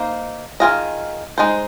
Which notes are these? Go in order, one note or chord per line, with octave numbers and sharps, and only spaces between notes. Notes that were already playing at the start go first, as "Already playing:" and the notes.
Already playing: A#3 D#4 C5
D#3 C4 F4 G#4 D#5
G#3 D#4 C5